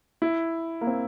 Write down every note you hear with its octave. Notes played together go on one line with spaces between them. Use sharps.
E4
A#3
C4